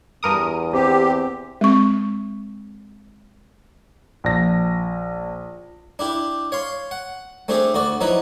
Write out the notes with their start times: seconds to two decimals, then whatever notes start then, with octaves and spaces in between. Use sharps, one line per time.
0.23 E2 G2 A#4 D#6
0.73 C4 G4
1.61 G#3 C4 C#6
4.24 A#1 A#6
5.99 D4 E4 G4
6.52 C#5 F5 C6
6.91 F#5
7.48 A3 C4 D4 G4 G#4
7.74 D2 F#4 D5
8.01 F3 F#3 D#4 E4 B4